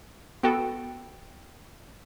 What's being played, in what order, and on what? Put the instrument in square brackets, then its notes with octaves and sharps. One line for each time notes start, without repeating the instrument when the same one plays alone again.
[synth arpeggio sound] B3 F#4 A4 [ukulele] G5